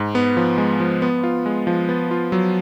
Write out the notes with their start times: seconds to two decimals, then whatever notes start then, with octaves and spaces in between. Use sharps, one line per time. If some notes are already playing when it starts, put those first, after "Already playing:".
Already playing: G#2
0.15 B3
0.37 F3
0.58 G#3
0.80 F3
1.02 B3
1.23 F4
1.46 G#3
1.67 F3
1.89 B3
2.11 F4
2.32 F#3